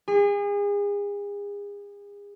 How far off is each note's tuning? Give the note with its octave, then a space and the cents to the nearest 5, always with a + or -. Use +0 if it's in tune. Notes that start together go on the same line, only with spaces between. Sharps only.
G#4 -35